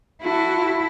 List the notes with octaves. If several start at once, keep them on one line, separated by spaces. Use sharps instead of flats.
E4 F#4 A4